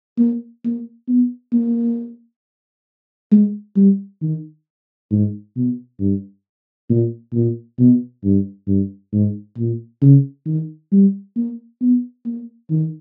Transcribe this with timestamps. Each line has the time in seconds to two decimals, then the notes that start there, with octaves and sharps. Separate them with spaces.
0.19 A#3
0.65 A#3
1.08 B3
1.53 A#3
3.32 G#3
3.77 G3
4.22 D#3
5.11 G#2
5.56 B2
6.00 G2
6.90 A#2
7.34 A#2
7.79 B2
8.24 G2
8.68 G2
9.13 G#2
9.57 A#2
10.02 C#3
10.46 D#3
10.92 G3
11.37 A#3
11.81 B3
12.26 A#3
12.70 D#3